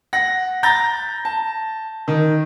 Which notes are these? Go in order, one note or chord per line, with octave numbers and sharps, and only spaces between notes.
F#5 A#6
A#5 B5 G6 A6 A#6
A5
D#3